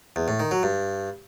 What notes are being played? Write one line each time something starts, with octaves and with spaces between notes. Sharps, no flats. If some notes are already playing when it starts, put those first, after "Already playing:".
E2
A2
D#3
F#3
G2